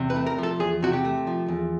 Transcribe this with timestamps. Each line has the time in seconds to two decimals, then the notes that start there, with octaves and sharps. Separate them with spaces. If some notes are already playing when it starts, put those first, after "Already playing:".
Already playing: E2 C3
0.10 B4
0.16 A3
0.26 A#4
0.38 F3 A4
0.60 E2 G#4
0.82 C3 F#4
0.93 G4
1.05 A3
1.27 F3
1.48 E2